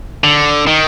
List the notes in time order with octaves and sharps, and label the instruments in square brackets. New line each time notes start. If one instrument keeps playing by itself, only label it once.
[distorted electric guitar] D3
D#3